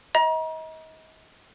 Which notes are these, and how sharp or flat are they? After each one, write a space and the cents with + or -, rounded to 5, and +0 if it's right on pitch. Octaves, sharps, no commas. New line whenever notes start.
D#5 +35 A#5 +35